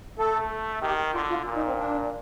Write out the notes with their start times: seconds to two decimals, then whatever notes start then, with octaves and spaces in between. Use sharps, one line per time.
0.18 A3 A4
0.82 D#3 G4
1.14 D3 F4
1.30 F4
1.46 A#2
1.56 D#4
1.67 C4
1.78 D4